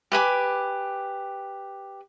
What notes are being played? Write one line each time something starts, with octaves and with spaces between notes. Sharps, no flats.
G4 B4 G#5 D6